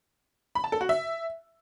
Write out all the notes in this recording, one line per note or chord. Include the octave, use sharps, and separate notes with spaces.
B5
A5
A4
F#4
E5